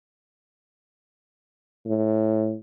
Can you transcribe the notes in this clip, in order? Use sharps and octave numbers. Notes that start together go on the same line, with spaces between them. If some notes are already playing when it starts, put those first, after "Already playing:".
A2